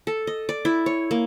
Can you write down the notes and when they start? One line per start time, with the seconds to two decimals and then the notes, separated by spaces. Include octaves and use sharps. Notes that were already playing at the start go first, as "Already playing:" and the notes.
0.07 A4
0.27 D#5
0.49 D5
0.65 E4
0.86 C#5
1.11 A#3